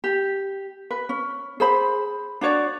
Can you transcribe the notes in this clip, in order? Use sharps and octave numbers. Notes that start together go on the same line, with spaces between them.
G4
B4
C#4
G#4 C5 B5
D4 F#4 C#5 D5